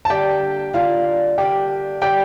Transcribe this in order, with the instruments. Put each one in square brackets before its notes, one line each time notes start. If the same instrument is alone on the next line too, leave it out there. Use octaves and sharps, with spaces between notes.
[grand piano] A5
[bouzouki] D3 G3 A#3 D4 [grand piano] G4 G5
[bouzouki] D3 G3 A#3 D4 [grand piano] F4 F5
[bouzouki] D3 G3 A#3 D4 [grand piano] G4 G5
[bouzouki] D3 G3 A#3 D4 [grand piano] G4 G5